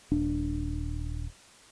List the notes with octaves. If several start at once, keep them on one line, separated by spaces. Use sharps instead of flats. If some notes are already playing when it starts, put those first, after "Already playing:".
D#1 D4